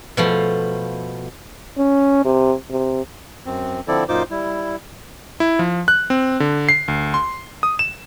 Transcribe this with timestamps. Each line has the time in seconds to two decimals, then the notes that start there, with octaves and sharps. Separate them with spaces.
0.17 B2 F3 A3
1.78 C#4
2.25 C3
2.70 C3
3.46 F#2 C4
3.88 D3 F3 C4 E4 A4 D5
4.09 F#2 A#2 D#4 F4 C5 D6
4.31 G3 E4
5.40 E4
5.59 F3
5.88 F#6
6.10 C4
6.40 D3
6.69 C7
6.88 D2
7.14 C6
7.63 D#6
7.79 E7